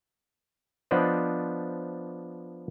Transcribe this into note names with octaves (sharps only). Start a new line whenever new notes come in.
F3 B3 D4 C5 D5 D#5